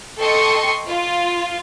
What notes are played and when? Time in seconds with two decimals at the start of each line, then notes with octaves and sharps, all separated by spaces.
0.20 A4 D#5 G5 C6 C#6 C#7
0.88 F4